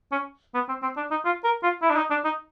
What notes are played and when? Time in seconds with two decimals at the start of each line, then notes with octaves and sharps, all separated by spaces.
0.12 C#4
0.54 B3
0.69 C4
0.83 C4
0.97 D4
1.11 D#4
1.25 F4
1.44 A#4
1.63 F4
1.82 E4
1.90 D4
1.97 D#4
2.10 D4
2.25 D#4